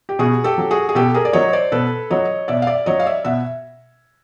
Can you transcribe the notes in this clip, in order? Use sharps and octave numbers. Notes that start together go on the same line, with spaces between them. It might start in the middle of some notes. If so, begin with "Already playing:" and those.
G4
B2 F#4 G#4
G4 A4
F#3
F#4 G#4
G#4
B2 G4 A4
G#4 A#4
D5
F#3 C#5 D#5
C5 D5
B2 A4 B4
F#3 C#5 D#5
B2 D5 E5
F5
D5 E5
F#3 C#5 D#5
F5
D5 E5
B2 E5 F#5